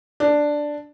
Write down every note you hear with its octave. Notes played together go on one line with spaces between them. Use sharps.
D4